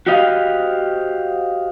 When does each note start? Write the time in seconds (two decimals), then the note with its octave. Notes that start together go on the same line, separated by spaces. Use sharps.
0.07 F#4 G4 C5 D#5 F5